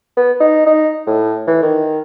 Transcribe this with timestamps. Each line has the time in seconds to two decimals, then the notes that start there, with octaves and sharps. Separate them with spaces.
0.17 B3
0.40 D#4
0.66 D#4
1.07 A2
1.47 E3
1.62 D#3